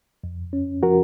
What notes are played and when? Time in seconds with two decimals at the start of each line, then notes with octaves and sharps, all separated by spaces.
0.24 F2
0.53 C#4
0.83 F3 F#4 A#4